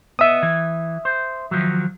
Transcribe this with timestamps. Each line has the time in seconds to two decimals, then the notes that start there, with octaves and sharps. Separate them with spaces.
0.19 B3 D#5 E5 D#6
0.43 E3
1.05 C5
1.51 D#3 F3 F#3